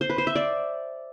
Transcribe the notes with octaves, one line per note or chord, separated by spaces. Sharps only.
C5
B4
C5
E5
D5